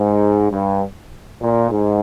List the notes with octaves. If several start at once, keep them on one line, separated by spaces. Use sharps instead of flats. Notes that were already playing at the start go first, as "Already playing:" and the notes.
Already playing: G#2
G2
A#2
G#2